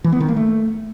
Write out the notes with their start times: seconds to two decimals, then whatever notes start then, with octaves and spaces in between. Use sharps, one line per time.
0.04 E3
0.12 B3
0.20 D#3
0.28 A#3
0.36 A3